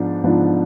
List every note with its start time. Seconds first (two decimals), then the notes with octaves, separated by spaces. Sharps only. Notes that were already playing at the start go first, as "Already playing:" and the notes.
Already playing: G#2 F3 B3 D4
0.24 G#2 F3 B3 D4